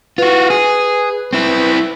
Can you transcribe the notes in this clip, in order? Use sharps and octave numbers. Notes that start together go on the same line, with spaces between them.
F4 F#4 B4
G#4
C4 E4